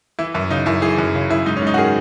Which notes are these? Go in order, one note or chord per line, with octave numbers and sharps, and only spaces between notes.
E3 E4
F#2 E4
C#3 D#4
F#2 E4
E3 G#4
F#2
C#3
F#2 E4
G#2 D#4
C#4
G#2
D#4
F#4
D#3 G#4